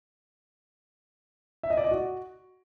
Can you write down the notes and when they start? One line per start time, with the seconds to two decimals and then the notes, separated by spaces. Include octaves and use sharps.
1.63 E5
1.70 D#5
1.77 D5
1.84 D#5
1.91 F#4